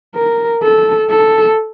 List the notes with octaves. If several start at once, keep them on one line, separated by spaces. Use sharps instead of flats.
A#4
A4
A4